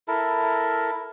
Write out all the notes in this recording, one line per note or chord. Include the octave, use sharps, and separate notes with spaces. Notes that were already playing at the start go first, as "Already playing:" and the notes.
E4 A4 A#4